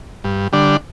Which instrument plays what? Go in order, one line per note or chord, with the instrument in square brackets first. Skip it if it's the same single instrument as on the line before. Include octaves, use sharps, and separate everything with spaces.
[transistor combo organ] G2
D3 G3 D4